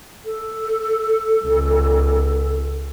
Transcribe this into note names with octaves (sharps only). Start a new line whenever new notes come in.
A4
C#2